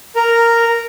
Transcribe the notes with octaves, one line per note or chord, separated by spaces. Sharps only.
A#4